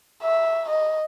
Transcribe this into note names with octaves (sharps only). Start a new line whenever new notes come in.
E5
D#5